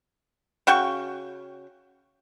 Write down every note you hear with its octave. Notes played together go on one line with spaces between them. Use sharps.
C#3 F#4 G5 C#6